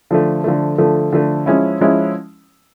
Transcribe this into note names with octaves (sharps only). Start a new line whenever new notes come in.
D3 F3 A3
D3 F3 A3
D3 F3 A3
D3 F3 A3
F3 G#3 C#4 E4
F3 G#3 C#4 E4